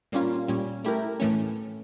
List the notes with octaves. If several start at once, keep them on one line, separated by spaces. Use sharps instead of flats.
A#2 G3 A#3 C#4 F4
A#2 G3 C#4
A3 E4 G4 A#4
A2 E3 A3 C#4